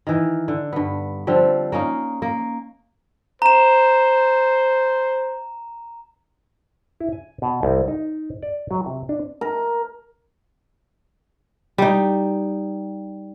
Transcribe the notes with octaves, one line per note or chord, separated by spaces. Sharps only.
D#3 E3
D3
G2 B3
D3 F3 G3 C4
A#3 C#4 D#4 F5
A#3
C5 A#5 E7
E4
G#5
B2
C2
D#4
D5
F#3
C3
D4
A#4
G3 D#4